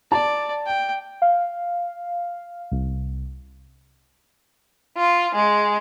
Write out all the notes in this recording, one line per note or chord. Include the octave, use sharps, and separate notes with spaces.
D5 A5
G5
F5
C2
F4
G#3